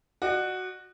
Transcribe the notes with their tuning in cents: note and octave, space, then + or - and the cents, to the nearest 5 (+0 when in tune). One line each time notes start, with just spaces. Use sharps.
F#4 +0 D5 +45